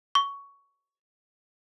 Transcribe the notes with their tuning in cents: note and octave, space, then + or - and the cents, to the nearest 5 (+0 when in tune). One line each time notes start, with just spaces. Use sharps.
C#6 +10